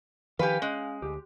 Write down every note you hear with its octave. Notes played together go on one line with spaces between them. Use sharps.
D#3 F3 G4 B4 F5 G#5
G#3 C#4
D2 G4